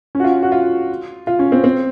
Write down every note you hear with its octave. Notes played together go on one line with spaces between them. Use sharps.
C#4
F#4
F4
F#4
F4
F4
C#4
C4
C4